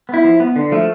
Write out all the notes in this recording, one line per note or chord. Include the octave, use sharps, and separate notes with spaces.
B3 E4
F3
B3
D3
F3 A3